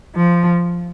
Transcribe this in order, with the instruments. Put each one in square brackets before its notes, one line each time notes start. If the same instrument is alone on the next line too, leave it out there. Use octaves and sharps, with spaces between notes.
[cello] F3